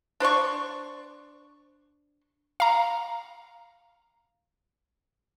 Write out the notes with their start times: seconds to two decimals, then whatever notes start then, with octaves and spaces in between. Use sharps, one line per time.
0.20 D4 C5 D5 C#6
2.60 F5 A#5